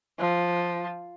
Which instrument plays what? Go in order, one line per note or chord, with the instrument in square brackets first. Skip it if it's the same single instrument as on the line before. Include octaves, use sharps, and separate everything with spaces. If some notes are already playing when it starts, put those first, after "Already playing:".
[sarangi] F3